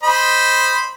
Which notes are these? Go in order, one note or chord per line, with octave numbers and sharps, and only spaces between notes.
C5 D#5 B5